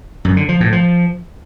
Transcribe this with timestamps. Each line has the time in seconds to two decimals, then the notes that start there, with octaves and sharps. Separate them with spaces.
0.25 F#2
0.37 D3
0.49 F3
0.60 A2
0.72 F3